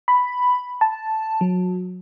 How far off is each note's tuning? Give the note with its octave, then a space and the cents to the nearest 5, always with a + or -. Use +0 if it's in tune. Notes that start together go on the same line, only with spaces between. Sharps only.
B5 +5
A5 +0
F#3 -25